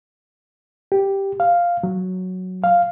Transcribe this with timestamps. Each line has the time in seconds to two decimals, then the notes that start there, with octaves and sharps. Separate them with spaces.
0.92 G4
1.40 F5
1.83 F#3
2.64 F5